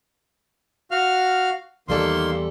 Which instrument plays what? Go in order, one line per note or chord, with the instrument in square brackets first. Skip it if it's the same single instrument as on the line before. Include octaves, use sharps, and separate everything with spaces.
[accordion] F#4 F5 F6
[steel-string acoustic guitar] E2 G3 A4 [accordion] D#3 A#3 C6